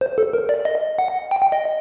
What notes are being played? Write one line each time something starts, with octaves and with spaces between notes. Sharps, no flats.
C5
A4
A#4
D5
D#5
F#5
G5
G5
D#5